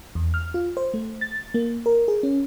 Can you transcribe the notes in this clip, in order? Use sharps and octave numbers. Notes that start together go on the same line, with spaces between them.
E2
F6
F4
C5
A3
A6
A#3
A#4
G#4
C#4